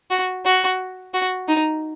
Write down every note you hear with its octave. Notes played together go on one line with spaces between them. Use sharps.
F#4
F#4
F#4
D#4